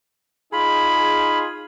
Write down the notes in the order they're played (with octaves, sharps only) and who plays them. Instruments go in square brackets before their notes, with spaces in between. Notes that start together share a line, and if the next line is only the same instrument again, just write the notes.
[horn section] D#4 F4 G#4 [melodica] B5